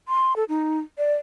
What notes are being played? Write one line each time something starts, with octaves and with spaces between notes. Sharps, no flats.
C6
A4
D#4
D5